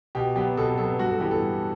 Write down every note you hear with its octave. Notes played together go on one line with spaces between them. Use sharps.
B2 G4
F#3 B3 G4
B2 A4
F#3 B3 A4
G2 F#4
A4
E3 B3 G4
A4
G2